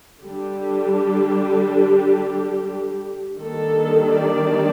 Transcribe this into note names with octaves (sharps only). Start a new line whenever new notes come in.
D3 G3 D4 G4
D#3 G3 A#3 D4 A4
D5